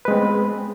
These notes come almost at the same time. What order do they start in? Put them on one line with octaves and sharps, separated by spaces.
B4 G#3 C4 B3